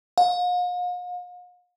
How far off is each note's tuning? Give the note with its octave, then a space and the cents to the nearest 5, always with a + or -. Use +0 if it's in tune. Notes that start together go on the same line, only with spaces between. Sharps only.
F5 +45